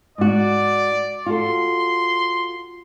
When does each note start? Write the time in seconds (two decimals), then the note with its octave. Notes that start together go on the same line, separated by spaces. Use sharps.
0.18 G#2 F#4 D5
1.26 F4 F#4 A4 C6